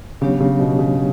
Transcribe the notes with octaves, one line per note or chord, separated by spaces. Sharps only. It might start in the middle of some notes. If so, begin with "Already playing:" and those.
C#3 F#3 B3 D4 G4 C#5
C#3
B2
C#3